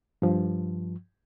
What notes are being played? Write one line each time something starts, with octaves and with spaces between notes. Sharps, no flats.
G2 F3